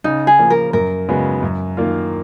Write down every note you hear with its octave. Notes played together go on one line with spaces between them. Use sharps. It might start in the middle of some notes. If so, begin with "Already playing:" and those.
C#3 D#4
G#4
F3 A#3
A#4
F#2 A#4
C#3 G#3 B3 F#4
F#2
D#3 A#3 F4